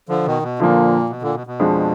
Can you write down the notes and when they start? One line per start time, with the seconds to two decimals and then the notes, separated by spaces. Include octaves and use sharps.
0.09 D3 F3
0.26 B2 D#3
0.42 B2
0.59 A#2 D3 F3 A#3
1.10 B2
1.22 A#2 D3
1.35 B2
1.47 B2
1.60 F2 F3 G#3 D4